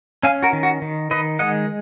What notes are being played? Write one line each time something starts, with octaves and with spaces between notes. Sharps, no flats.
C#4 F5 G#5
F#4 A#4
D#3
F#4
D#3
D#3 B4 D#5
G#3 D#5 F#5